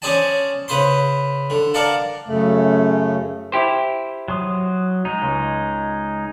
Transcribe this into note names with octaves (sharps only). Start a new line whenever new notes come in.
C#4 G#4 C5 D5 G#5 A5
C#3 B4 C5 C6
D3
A#4 D5 F5 F#5 A5
F#2 C#3 A3
E4 G4 C5
F#3 C6 D#6
G#3 D#4
C#2